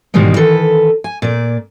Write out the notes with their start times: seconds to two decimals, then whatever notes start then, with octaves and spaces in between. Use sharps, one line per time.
0.14 G#2 B2 D#3 E3 G3 G#3
0.36 D#3 E3 A4 B4
1.04 G#5
1.22 A#2 D5